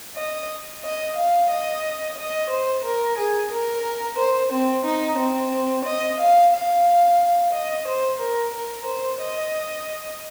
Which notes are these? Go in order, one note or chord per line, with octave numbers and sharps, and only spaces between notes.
D#5
D#5
F5
D#5
D#5
C5
A#4
G#4
A#4
C5
C4
D#4
C4
D#5
F5
F5
D#5
C5
A#4
A#4
C5
D#5